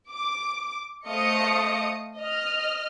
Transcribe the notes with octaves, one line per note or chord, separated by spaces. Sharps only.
D6
A3 C5 D#5 F5 D#6 C#7
D#5 F6